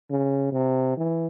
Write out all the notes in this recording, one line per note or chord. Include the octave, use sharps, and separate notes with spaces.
C#3
C3
E3